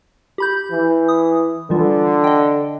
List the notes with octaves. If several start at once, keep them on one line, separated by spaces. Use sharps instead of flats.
G4 B5 G6
E3
D#6
D3 E3 G3 F4
D#5 G5